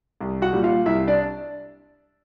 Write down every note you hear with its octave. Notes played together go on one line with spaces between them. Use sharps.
C2
F#4 F#5
A#2 G3
F4 F5
C2 E4 E5
D4 D5